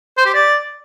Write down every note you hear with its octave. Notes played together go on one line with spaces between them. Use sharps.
C5
G4
D5